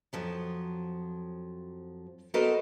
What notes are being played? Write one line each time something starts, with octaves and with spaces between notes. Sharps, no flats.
F2 F3 F#3
B3 F#4 A4 A#4 C5 D#5